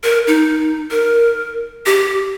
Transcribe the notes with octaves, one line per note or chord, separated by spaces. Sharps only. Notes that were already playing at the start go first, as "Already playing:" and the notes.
A#4
D#4
A#4
G4